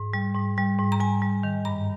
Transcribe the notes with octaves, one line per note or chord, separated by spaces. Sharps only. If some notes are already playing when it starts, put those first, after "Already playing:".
Already playing: G#2
G3
G#2
G3
G#2
A#5
G3 G#5
G3
D#3
G2 A#5